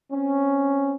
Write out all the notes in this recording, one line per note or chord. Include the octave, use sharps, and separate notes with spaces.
C4 C#4